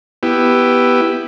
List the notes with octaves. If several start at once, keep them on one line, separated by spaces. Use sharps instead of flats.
B3 E4 G4